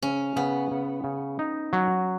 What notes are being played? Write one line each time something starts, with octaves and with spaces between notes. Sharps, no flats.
C#3 C#4
C#3 B3
C#3
C#3
D#4
F#3